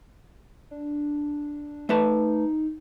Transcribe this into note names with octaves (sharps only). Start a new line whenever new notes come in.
D4
A3 D#4 B4 A5